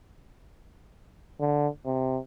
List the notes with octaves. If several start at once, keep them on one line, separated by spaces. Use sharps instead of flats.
D3
C3